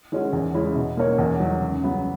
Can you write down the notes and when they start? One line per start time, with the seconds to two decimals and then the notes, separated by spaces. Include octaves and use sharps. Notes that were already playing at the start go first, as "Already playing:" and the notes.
0.12 D#3 G#3 C#4 F#4
0.33 E2
0.55 C#3 G#3 C#4 E4
0.76 B2
0.97 A#3 D#4 A#4 C#5
1.18 E2
1.40 D#3 F#3
1.61 C#2
1.83 C#3 F#3 B3